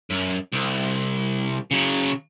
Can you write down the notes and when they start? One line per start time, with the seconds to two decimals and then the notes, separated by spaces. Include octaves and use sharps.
0.10 F#2
0.52 C2
1.71 C#3 F#3